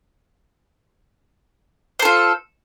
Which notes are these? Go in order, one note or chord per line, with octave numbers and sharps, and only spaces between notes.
F4 A4 C5